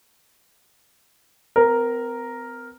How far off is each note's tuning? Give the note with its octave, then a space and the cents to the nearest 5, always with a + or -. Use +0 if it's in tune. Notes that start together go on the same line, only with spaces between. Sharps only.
C4 -45 A#4 +0